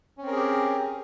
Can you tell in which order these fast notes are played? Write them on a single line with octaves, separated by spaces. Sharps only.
C#4 C4 A#4 G#4 G4